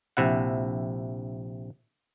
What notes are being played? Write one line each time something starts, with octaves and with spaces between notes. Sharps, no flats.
A#1 C3 E4 F#5